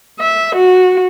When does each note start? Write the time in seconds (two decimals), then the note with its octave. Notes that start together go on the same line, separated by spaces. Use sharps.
0.20 E5
0.55 F#4